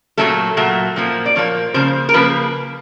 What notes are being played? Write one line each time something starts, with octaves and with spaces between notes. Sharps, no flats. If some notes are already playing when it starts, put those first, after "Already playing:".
A#2 F#3 A3 A4
A#2 F#3 A3
A#2 F3 A#3
D5
A#2 F3 A#3 C#5
C#3 F3 A#3 C5
A#4
C#3 F3 A#3 B4